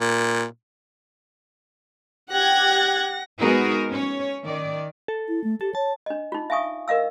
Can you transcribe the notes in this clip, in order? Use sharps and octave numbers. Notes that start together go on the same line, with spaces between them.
A#2
G4 F#5 F#6 G#6 A#6
G#3 B3 D#4 F#4 G#4 A#4
C#4 C#5
D#3 D5
A4
E4
A3
G4 A4
C#5 A5
D4 D#5
D#4 F4
E5 F5 G#5 C#6 D#6
A#4 D#5 F5 E6